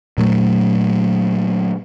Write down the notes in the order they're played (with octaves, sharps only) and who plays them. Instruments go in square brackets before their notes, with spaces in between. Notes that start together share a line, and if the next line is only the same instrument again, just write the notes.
[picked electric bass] A#2 F#3 A3